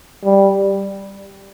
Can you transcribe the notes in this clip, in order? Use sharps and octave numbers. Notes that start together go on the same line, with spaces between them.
G3